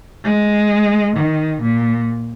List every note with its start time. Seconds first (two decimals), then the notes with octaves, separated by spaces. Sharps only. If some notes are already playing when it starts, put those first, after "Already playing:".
0.26 G#3
1.16 D#3
1.62 A#2